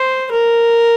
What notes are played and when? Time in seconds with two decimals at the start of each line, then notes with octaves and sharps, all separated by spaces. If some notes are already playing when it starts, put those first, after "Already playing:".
Already playing: C5
0.31 A#4